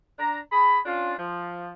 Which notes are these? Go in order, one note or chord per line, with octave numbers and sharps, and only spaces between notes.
D4 A#5
G#4 B5
C#4 D4 F4
F3